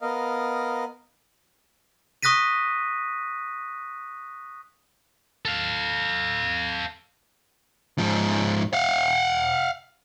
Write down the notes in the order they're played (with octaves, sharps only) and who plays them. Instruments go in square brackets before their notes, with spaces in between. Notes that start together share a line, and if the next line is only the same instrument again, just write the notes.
[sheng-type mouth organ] B3 A#4 D#5 F5
[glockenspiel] C#6 D#6 F#6 A#6 B6 D#7
[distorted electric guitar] A4 F5
[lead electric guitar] G#2 F3
F5 F#5